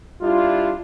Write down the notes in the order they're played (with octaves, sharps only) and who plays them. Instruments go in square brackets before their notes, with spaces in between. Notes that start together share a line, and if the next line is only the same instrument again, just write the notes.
[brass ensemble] G3 D4 E4 F4